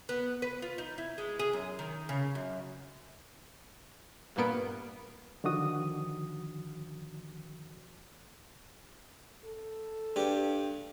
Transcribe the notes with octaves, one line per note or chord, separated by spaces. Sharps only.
B3
B4
F4
D#4
E4
G#3
G#4
F#2
D#3
C#3
F#2
G2 A#2 A#3 B3 D7
D3 D#3 F3 F#4 D#6
A4
G2 G4